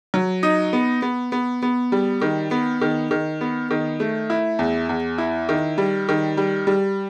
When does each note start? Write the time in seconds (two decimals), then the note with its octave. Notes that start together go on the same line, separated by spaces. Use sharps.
0.14 F#3
0.43 D#4
0.73 B3
1.02 B3
1.32 B3
1.63 B3
1.92 G3
2.21 D#3
2.51 B3
2.81 D#3
3.11 D#3
3.41 B3
3.71 D#3
4.00 A3
4.30 E4
4.59 E2
4.89 E2
5.18 E4
5.49 D#3
5.78 G3
6.09 D#3
6.37 G3
6.67 G3